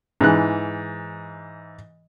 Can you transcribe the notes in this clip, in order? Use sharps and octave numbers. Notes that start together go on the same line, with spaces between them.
G#2 E3 F#6